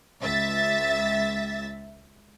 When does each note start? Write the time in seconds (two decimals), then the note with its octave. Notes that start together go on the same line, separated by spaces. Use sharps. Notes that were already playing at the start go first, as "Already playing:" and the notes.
0.22 C#2 E5 A6 B6